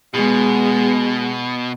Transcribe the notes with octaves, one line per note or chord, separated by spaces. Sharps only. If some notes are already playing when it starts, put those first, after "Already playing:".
B2 G#3 B3